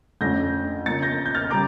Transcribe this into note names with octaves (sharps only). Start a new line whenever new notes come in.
F2 D3 A3 C#4 G6 A#6
C#3 F3 A#3 A6 C#7
G6 A#6
G6
F6 A6
C#3 G3 A#5 D6